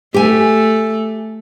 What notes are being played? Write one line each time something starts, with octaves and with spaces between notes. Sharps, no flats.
A3 G4 G#5